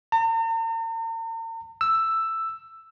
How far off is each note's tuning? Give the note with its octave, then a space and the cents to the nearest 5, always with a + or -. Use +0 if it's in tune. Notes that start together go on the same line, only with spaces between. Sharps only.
A#5 -45
E6 +5